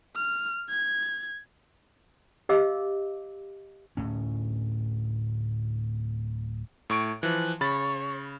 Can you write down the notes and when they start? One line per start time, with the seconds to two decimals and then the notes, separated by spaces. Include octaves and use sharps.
0.15 F6
0.70 G#6
2.49 G4 D#5 F5 D6 E6
3.97 D1 A2 C#4
6.90 A2 C#6 D7
7.23 E3 F3 F#6
7.61 C#3 C#5 B5 A6